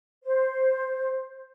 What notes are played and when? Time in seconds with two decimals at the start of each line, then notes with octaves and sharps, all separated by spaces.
0.24 C5